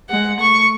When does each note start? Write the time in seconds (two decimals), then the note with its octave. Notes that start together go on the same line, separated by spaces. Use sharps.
0.09 G#3 F#5
0.40 A3 C#6